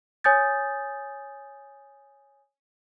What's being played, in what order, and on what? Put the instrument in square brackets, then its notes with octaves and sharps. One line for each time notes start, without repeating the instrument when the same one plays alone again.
[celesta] C#5 G#5 D#6 G6 A6